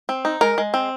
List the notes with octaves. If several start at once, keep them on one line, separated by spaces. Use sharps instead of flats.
C4
D#4
G#3 A#4
G#3
C4